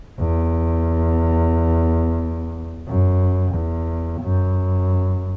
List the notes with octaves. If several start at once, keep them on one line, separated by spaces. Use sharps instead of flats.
E2
F#2
E2
F#2